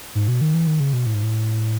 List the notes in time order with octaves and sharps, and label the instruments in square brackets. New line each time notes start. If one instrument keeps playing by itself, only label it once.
[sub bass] G#2
B2
D#3
E3
D#3
C#3
B2
A2
G#2
A2